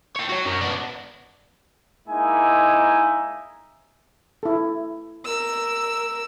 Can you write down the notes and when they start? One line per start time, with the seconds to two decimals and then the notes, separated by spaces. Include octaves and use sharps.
0.16 C#5 G5
0.29 F#4 C#5
0.45 F#2 A#4
0.61 B3 D4
2.08 G#3 A#3 D#4 E4 G#5
4.43 E4 A4
5.25 A#4 E6